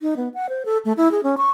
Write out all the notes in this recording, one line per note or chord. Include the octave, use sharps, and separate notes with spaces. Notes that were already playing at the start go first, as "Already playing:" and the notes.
D#4
B3
F#5
C5
A4
A3
E4
G#4
C#4
C#6